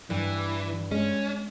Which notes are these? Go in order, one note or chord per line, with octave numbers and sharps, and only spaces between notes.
G2 E3
G#3 C#4